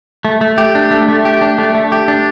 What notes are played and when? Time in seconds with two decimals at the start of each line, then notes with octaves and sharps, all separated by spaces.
0.25 A3
0.41 A3
0.58 G4
0.75 D4
0.91 A3
1.09 A3
1.25 G4
1.42 D4
1.58 A3
1.75 A3
1.92 G4
2.08 D4